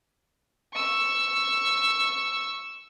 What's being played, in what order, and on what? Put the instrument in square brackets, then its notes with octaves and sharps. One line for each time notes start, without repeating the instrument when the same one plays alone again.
[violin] C#6 E6